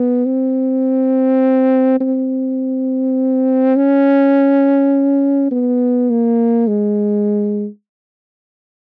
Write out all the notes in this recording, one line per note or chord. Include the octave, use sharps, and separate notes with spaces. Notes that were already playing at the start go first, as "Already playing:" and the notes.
Already playing: B3
C4
C4
C#4
B3
A#3
G#3